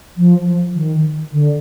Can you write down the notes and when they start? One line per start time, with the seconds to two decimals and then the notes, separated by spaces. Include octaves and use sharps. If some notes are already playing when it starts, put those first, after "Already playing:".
0.17 F3
0.75 D#3
1.32 D3